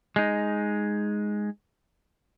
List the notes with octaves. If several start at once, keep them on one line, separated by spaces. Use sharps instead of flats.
G#3 D#4